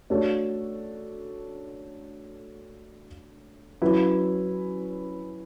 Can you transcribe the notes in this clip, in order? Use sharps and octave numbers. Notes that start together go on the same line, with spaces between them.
A3 D4 F#4 A4 C#5
F#3 C#4 E4 B4